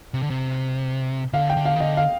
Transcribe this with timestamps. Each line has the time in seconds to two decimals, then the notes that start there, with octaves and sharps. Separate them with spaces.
0.14 C3
0.22 D3
0.30 C3
1.33 D3 F5
1.50 G5
1.57 D3
1.66 F5
1.76 D#3
1.80 D3 D#5
1.97 F5